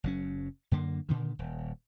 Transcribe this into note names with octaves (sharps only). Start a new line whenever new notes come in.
F#1 F#3 C#4
F#2 D3 A#3
A#2 D3 D#3
D#1